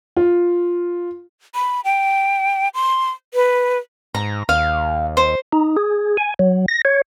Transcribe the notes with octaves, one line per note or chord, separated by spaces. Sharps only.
F4
B5
G5
C6
B4
G#2 A#5
D#2 F5
C5
D#4
G#4
G#5
F#3
A#6
C#5